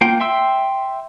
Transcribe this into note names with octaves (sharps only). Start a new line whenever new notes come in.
A#3 F4 G5
E5 G5 C6 E6